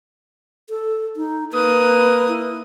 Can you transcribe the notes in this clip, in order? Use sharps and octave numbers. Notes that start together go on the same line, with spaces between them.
A4
D#4
A#3 B4 D#6
E4